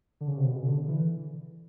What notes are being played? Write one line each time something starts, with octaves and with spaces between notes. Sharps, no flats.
D3
C#3
C3
B2
C#3
D3
E3